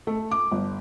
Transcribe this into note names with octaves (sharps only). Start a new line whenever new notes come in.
A3
D6
G1